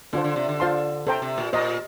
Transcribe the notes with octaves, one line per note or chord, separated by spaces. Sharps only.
D3 D4 F4 C5
D3
C3
D3
F4 C5 F5 A5 C6
C3 A4 C5 G5 A#5
C3
A#2
A#2 C5 D#5 A#5